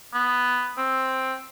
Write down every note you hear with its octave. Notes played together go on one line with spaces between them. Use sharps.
B3
C4